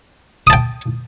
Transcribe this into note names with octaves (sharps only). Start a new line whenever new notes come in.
G5 A5 D#6